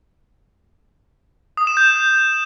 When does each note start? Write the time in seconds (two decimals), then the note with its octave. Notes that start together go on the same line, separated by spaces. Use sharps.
1.57 D#6
1.67 E7
1.77 G6